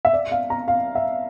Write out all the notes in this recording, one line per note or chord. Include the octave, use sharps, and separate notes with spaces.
E5
D5
F5
A#5
F5
E5